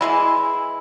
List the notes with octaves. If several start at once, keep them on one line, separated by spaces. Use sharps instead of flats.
E3 G#3 E4 B5